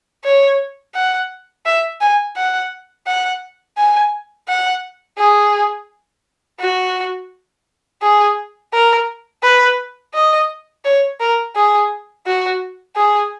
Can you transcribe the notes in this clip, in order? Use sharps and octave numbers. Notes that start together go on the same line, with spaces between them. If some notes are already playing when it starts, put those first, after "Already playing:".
C#5
F#5
E5
G#5
F#5
F#5
G#5
F#5
G#4
F#4
G#4
A#4
B4
D#5
C#5
A#4
G#4
F#4
G#4